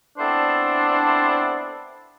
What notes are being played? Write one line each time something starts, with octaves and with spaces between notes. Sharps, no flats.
B3 C4 D4 E4 A4 C5